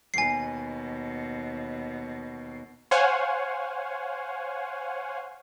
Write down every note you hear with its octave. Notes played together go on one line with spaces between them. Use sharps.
D#2 B2 G#5 C7
C5 C#5 F5 F#5 G#5